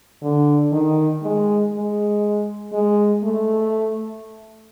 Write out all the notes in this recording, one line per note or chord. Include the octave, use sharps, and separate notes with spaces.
D3
D#3
G#3
G#3
G#3
A3